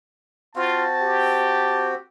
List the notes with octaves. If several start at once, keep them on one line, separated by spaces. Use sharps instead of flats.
C4 F4 F#4 A5
G4